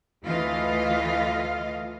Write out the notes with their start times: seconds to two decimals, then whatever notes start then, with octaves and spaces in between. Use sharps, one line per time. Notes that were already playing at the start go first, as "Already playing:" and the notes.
0.25 D2 E3 A3 F4 D#5 F5